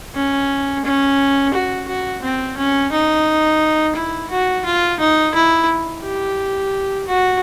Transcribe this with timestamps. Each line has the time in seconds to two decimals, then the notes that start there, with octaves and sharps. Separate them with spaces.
0.15 C#4
0.85 C#4
1.54 F#4
1.88 F#4
2.23 C4
2.57 C#4
2.92 D#4
3.96 E4
4.30 F#4
4.65 F4
5.00 D#4
5.34 E4
6.03 G4
7.07 F#4